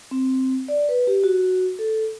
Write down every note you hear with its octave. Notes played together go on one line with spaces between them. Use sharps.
C4
D5
B4
G4
F#4
A4